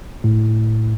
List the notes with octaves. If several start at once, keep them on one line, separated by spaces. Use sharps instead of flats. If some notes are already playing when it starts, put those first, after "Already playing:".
A2